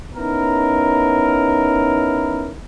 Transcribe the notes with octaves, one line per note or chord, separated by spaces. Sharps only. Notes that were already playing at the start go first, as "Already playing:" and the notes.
B3 C#4 D#4 E4 A#4